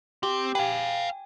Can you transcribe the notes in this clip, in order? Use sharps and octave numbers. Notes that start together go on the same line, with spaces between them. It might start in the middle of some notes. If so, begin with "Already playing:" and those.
C4 G4
B4 F5 G5 G#5